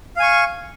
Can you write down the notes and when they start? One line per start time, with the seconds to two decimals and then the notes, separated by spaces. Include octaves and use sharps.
0.17 F5
0.20 G#5
0.23 C#6